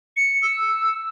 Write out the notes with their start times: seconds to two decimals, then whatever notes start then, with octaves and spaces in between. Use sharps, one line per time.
0.17 C#7
0.43 E6